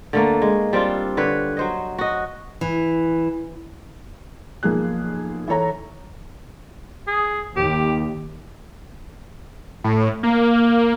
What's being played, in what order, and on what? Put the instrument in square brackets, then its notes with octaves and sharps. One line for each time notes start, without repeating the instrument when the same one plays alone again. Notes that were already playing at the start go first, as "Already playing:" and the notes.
[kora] D3 A3 A#3
G#3
G3 C4 D4 F4
D3 B4 C#5
F#3 C5 D#5
F#4 D#5
[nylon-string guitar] E3
[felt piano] B1 F3 A#3 G#4 F#6
E3 A4 C#5 A#5
[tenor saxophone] G#4
[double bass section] D#2 [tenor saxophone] G4
[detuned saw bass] A2
A#3